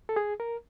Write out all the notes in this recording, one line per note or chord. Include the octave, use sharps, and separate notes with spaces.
A4
G#4
A#4